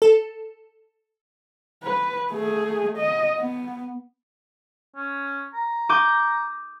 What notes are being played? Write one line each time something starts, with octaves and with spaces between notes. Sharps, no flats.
A4
B4
A3 G#4
D#5
B3
C#4
A#5
D6 D#6 G6